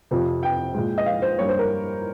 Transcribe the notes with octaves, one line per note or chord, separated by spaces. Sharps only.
F2 C3 F3
G5
A#2 G#3
D#5
F5
C5
G2 G3 A#3 C#5
C5
A#4